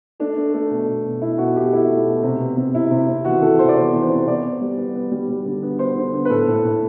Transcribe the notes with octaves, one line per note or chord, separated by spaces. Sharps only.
A3 D4
A3
A3
B2
B2
B2
B2 E4
B2 F#4
B2 G4
A3 E4
A3
B2
C3
B3
C3
C3 E4
C3
C3
E3 F#4
E3 A4
C3 C5
D5
B3 C5
E3
C5
C3
B3 D5
B3
G3
B3
B3
G3
G3
D3
B3
B3 C5
D3
B3
B4
A2 A4
A2
A2